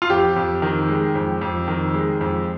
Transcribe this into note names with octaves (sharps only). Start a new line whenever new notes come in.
F4
F2 G4
F2
D#3
G#3
F2
F2
D#3
G#3
F2